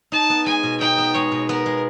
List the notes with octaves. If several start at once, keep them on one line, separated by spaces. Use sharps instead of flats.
D#4 A5
B3
G#3 G#5
B2
D#4 G5
B3
G#3 C#5
B2
B3 A#4
G#3